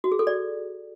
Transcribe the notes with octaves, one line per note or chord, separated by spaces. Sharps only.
F#4
G#4
A4
D5